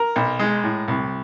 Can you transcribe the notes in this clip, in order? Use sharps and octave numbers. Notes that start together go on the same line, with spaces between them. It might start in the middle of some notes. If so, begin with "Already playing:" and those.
Already playing: A#4
B1
G#3
A2
C2